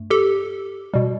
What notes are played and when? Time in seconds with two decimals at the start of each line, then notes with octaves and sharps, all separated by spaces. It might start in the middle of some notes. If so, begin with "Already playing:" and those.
Already playing: G2 A3
0.10 G4 A4
0.94 B2 G3